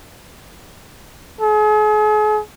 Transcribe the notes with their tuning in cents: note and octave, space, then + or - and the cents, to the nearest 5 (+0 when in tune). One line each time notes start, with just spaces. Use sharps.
G#4 +40